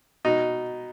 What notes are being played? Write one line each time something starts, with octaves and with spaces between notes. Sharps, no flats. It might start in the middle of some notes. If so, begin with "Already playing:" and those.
B2 D#4